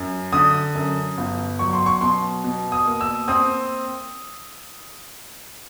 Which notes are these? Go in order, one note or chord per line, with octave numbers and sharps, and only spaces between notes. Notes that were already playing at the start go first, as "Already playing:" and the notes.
Already playing: F#2
D3 D#6
F#2
G1
F#3 C#6
C6
C#6
B2 C6
B2
D#6
A#3
E6
C4 D#6